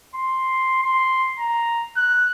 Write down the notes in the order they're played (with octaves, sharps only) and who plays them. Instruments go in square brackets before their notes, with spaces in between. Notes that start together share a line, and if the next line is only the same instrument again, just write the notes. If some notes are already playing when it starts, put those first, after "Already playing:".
[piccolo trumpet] C6
C6
A#5
F#6